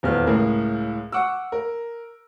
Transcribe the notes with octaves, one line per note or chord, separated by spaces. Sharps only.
D#1 E2 E3 F6
C#2 A2 G#4 A#4
F#5 C#6 D6 E6
A#4